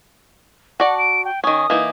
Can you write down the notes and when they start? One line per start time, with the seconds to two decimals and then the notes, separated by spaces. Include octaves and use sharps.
0.80 F#4 D5 F#5 A5
0.98 D7
1.25 G5
1.44 D#3 C#4 D#6
1.70 E3 A#3 D#4